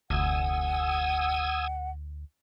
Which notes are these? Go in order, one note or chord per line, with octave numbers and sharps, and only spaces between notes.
F1 D2 F#5 G#5 D#6 E6